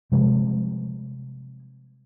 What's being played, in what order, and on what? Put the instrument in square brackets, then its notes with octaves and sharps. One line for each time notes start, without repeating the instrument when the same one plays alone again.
[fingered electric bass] C3 F3 G3 G#3